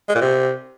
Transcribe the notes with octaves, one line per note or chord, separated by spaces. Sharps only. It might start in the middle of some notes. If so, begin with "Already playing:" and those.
G#3
A#2
C3